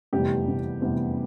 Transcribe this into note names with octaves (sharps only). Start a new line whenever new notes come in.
F1 E2 C3 G3 B3 G4
F1 E2 C3 G3 B3
F1 E2 C3 G3 B3